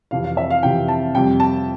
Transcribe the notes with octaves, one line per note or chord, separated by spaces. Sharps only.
F2 C3 E3 F5
F5
E5
F5
F2 C3 E3 G5
A5
F2 C3 G3 G5
A5